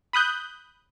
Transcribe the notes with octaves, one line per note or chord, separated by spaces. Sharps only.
B5 D#6 F#6 G6